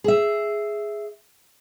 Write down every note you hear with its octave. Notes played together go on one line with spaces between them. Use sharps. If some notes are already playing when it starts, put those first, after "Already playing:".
G#4 E5